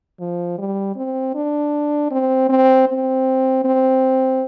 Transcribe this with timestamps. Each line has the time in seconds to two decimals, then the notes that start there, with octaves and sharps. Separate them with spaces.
0.20 F3
0.58 G3
0.96 C4
1.34 D4
2.11 C4
2.49 C4
2.88 C4
3.64 C4